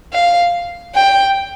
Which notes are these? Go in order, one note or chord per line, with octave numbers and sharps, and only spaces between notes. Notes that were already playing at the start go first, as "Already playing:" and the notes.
F5
G5